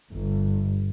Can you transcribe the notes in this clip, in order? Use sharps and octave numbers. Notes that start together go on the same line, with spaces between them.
G1